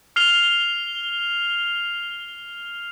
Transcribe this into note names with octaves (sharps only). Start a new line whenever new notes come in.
F6 C7 F7 G7